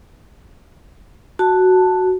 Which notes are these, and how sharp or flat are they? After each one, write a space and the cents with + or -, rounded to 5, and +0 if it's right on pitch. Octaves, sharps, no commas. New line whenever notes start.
F#4 +0 A5 +5